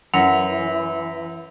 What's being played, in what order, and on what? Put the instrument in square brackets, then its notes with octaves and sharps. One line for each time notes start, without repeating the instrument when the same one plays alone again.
[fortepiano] F#2 [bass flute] E3 [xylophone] F#5 [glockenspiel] F7